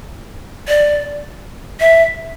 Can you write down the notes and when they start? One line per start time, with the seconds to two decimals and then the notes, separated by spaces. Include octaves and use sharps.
0.68 D5
1.80 E5